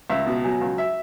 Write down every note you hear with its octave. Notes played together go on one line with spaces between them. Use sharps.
C#2 E5
B2
F#3 G#5
C#2
E5